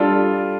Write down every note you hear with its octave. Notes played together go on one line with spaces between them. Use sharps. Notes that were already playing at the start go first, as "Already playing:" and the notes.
Already playing: G3 D4 F4 A4 D5